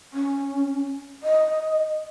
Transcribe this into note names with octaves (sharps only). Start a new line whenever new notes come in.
C#4
D#5